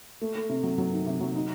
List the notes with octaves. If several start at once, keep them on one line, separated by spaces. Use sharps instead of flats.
A3
A3
C3
F#3
F#3
D#3
C3
F#3
D#4